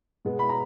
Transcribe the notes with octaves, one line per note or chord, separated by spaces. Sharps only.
B2 G#3 B3
B5
A#5